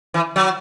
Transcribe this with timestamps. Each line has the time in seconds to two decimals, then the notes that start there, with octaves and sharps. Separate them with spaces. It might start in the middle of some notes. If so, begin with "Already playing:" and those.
0.14 E3
0.36 F#3